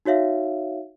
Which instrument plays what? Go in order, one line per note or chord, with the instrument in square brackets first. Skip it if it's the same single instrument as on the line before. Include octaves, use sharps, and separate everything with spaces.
[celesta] D#4 F#4 C#5 E5 F5